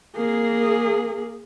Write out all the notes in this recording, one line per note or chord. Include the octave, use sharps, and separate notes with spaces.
A#3 G#4